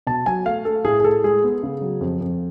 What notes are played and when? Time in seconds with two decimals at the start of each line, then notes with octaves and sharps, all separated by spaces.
0.07 B2 A5
0.26 F#3 G#5
0.45 A3 F5
0.65 A3 A4
0.84 A2 G#4
1.00 G#4
1.04 A2 A4
1.24 G#3 G#4
1.43 B3
1.63 C#3
1.81 F#3
2.01 F2
2.21 F2